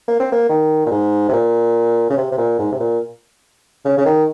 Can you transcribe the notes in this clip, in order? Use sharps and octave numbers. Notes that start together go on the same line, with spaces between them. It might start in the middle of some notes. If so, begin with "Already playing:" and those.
A#3
C4
A#3
D#3
A#2
G#2
C3
A#2
C#3
C3
C3
A#2
G#2
C3
A#2
C#3
C#3
D#3